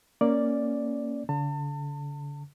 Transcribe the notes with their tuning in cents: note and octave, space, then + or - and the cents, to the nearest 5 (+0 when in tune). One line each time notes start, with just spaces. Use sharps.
A#3 +0 C#4 +0 D5 +0
D3 -40 A5 +35